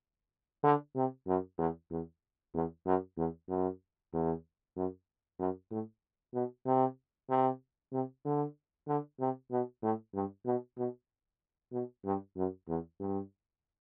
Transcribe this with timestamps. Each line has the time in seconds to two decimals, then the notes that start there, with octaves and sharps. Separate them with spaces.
0.64 D3
0.96 C3
1.27 F#2
1.58 E2
1.91 E2
2.54 E2
2.86 F#2
3.17 E2
3.48 F#2
4.13 E2
4.76 F#2
5.39 F#2
5.71 A2
6.34 B2
6.66 C3
7.30 C3
7.93 C3
8.25 D3
8.88 D3
9.20 C3
9.51 B2
9.83 A2
10.14 G2
10.45 B2
10.77 B2
11.72 B2
12.05 G2
12.36 F#2
12.68 E2
13.00 G2